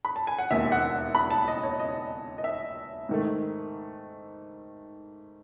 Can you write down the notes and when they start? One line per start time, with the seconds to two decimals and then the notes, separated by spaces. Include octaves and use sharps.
0.05 B5
0.16 A5
0.27 G#5
0.38 F#5
0.51 E1 D#2 D#3 E5
0.72 F#5
1.15 B5
1.30 A5
1.48 D#5
1.63 C#5
1.80 D#5
2.38 D#5
2.44 E5
3.09 G#2 D#3 A3